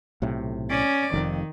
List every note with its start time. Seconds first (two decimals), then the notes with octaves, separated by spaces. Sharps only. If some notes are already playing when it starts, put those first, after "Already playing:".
0.22 B1 A2 C3
0.70 C#4 D5
1.14 F1 F2 D#3